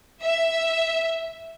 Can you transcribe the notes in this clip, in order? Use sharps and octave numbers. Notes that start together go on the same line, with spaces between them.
E5